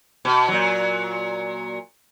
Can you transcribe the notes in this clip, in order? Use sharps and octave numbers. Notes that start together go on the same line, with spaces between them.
B2
A#2 F#3